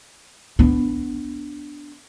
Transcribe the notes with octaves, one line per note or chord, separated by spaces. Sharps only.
B3 D4